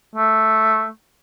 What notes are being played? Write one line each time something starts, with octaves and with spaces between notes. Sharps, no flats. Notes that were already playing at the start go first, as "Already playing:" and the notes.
A3